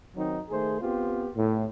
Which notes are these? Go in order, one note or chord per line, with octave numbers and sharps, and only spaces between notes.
D#3 F#3 C4 D#4
D#3 A3 G#4 C5
B3 C4 F4 G4
A2